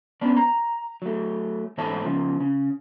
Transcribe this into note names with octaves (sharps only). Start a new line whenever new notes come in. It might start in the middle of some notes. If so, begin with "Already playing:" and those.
B3 C#4 D4
A#5
F#3 A3
G#2 E3 A4 C#5 E5 A5
C#3 F3
C#3